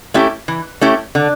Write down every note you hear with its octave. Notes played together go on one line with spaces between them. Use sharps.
A3 C#4 E4 G4
E3
A3 C#4 E4 G4
D3